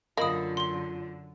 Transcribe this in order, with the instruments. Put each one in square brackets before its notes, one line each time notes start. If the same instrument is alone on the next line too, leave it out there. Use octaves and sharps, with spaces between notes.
[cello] F#2 D3 [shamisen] A#3 [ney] F4 [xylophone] D#5 B5 D#6
[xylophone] C6 G7